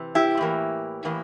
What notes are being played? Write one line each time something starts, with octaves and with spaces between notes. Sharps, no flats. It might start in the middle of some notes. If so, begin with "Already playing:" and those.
Already playing: C3 E3
E4 G4
A2 E3 A#3
A2 E3 A#3